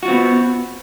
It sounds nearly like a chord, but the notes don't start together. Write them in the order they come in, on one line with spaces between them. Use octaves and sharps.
F#4 F4 C4 B3